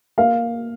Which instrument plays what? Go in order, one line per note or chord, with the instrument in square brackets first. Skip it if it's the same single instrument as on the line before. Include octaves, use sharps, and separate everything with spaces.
[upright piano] A#3 F5